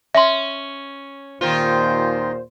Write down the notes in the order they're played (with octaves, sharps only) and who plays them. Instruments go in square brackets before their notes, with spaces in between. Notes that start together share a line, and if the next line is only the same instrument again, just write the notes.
[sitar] C#4 [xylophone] E5 C6
[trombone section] D#2 A#2 C5 [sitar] D#3 C4 F4